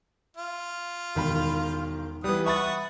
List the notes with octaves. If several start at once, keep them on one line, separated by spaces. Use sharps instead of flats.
F4
E1 D#3 B5
E3 G3 B3 D#6
E5 F#5 B5 C#6 D#6 A6